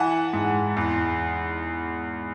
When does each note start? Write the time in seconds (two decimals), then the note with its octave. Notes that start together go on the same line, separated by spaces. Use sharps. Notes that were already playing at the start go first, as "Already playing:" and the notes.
Already playing: E3 F#5 A5
0.33 G#2
0.76 E2